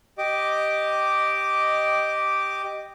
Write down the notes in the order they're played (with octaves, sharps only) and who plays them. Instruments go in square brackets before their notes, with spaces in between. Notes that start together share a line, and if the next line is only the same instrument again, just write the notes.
[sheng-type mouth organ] G4 D#5 D6